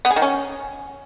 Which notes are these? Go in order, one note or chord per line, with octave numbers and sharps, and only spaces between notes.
B3
G#4
D#3
C#4